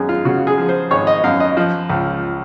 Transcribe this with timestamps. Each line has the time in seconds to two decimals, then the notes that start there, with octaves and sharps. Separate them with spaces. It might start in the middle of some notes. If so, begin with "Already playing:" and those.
Already playing: G#1 F#2 G#4
0.09 F4
0.25 C#3 F#4
0.47 G#4
0.58 F3
0.69 C5
0.91 G#1 C#5
1.07 D#5
1.24 F#2 F5
1.40 D#5
1.57 F3
1.90 C#2